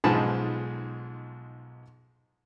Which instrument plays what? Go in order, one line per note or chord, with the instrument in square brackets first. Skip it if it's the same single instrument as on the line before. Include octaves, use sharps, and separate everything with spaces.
[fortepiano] B1 G#2 F3 G#4 A5 B5